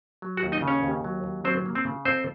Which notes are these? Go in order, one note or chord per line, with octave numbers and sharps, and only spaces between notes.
F#3
F#4 F#5
D#2
D#4 D#5
C#3
C#4 C#5
D#2
F#3
D#2
F#3 C4 C5
A#3
C4 C5
C#3
F2 C4 C5